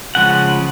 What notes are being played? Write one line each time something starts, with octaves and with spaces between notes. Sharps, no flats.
C#3 F3 G#3 F#5